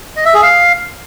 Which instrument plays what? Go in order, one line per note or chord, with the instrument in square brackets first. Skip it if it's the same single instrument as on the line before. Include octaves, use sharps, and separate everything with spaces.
[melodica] D#5
E5
G#4
F5